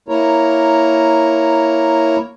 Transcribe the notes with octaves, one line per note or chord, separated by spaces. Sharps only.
A#3 E4 A#4 C#5 A#5